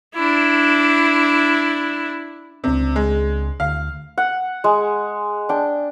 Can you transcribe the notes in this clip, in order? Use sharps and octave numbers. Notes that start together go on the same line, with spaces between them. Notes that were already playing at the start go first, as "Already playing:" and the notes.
D4 E4
C#2 C3 C4 D4
G#3
D2 F5
F#5
G#3
D4 G5